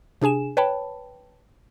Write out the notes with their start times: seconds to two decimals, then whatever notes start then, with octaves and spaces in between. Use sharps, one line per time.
0.22 C3 D4 G#4 G#5 E7
0.57 B4 C#5 G5 A5 B5